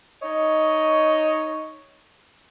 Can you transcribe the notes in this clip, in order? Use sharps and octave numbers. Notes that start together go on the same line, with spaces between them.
D#4 C#5 D#5